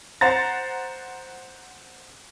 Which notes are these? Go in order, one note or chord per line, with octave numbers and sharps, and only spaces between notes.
C5 F#5 A#5 A6